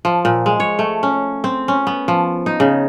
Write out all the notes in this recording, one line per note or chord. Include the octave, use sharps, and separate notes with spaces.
F3
A#2
G#3
C#5
A3
C#4
C4
C#4
B3
F3
D#4
C#3